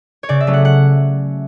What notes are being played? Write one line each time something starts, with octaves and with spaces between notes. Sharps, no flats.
C#5
C#3 D5
E5
F#3 A3 C#4
F#5
F#5